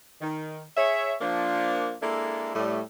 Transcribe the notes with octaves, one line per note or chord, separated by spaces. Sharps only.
D#3
G#4 C#5 E5
F3 A#3 D4
G#3 A#3 D4 E4 A4
A2 G3 A3